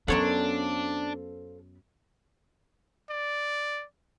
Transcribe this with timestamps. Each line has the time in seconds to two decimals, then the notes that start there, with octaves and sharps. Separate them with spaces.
0.08 F#2 B3 D4 A4 C5 C#5 F5 F#5
3.11 D5